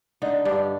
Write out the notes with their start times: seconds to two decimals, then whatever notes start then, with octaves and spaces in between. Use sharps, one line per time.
0.22 D3 D#4
0.45 G2 D4